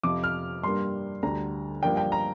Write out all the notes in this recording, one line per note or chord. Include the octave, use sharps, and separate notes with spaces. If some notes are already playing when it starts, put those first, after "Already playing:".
F2 C3 F3 D6
F6
G2 G3 A#3 D4 C6
D2 D3 G3 A#5
G2 F3 A#3 D4 G5
G5
A#5